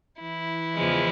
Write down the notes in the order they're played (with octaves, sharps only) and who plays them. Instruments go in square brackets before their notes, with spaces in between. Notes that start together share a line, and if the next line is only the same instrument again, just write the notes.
[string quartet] E3 E4
E2 C#3 F3 G#3